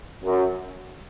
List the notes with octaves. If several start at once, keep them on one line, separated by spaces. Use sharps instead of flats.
F#2